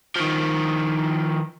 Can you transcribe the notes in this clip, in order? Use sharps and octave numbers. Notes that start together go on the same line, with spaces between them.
D#3 F3